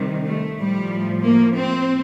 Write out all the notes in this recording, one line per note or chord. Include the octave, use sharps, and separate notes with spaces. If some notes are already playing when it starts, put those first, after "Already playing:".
Already playing: C3 D#3 G3
A3
A2 F3 G3
A#3
C4